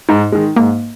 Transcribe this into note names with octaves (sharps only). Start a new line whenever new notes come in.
G#2 D#4
D#3 G#3
G#2 A#3